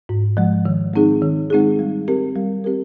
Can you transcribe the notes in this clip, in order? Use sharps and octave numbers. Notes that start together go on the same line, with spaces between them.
G#2
F3 G#3
D#3
G#3 C4 D#4 G#4
D#3
G#3 C4 D#4 G#4
G3
C4 G4 A#4
G3
C4 G4 A#4